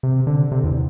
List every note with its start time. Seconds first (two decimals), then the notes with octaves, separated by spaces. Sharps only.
0.03 C3
0.27 D3
0.52 C3
0.64 E2